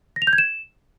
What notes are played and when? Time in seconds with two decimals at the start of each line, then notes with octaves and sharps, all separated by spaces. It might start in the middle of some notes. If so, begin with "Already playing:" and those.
0.16 A#6
0.22 F7
0.27 G6
0.33 G#6
0.38 E7